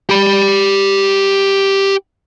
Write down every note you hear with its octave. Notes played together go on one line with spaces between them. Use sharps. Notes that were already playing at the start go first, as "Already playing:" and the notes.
G4 B5